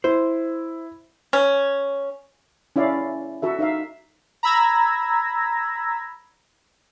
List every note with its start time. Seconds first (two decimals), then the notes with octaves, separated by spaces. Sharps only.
0.04 E4 C5
1.33 C#4
2.76 C#4 E4 D5 F5
3.42 F#4 A4 E5
3.59 D#4 E5 F5
4.43 A#5 B5 E6 G#6 A#6